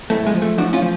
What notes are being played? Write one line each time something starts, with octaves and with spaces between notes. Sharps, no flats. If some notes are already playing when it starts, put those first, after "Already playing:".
A2 A3
G#3
F3
A3
A2 D4 F#4
C#4 F4
F3